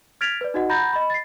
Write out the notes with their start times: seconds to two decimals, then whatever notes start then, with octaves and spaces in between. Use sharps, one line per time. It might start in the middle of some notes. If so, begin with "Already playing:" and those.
0.21 F6 G#6 A6 B6 D7 F7
0.41 B4 D5
0.54 D#4 F#4 D#5 F#5
0.69 F#5 A#5 B5 G6 A6 A#6
0.93 D#5 B5
1.10 A6 C7